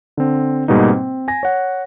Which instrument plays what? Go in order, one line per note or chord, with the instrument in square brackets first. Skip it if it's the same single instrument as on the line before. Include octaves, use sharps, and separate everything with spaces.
[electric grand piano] D3 C4
G#2 B2 G3 A#3 D#4
C4
G#5 A#6
C#5 F#5